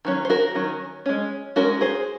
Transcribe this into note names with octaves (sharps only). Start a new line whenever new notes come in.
D#3 F#3 C#4
C5
F#4 A#4
D#3 F#3 C#4
G#3 C#4
G#3 C#4 F#4 A#4
G#4 C5